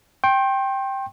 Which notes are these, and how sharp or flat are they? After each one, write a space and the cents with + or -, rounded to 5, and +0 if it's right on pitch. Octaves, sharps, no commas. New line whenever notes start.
G5 +0 C6 +40